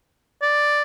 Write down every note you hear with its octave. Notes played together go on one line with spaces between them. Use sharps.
D5